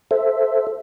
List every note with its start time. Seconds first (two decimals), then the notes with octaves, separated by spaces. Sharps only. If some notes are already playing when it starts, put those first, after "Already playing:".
0.11 A4 C5 E5